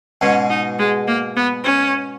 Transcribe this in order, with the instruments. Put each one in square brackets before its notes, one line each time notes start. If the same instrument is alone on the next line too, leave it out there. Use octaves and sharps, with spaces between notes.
[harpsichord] G#2 B2 [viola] C#4
[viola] D#4
G#3
A#3
B3
C#4